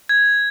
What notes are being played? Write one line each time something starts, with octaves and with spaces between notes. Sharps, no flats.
G#6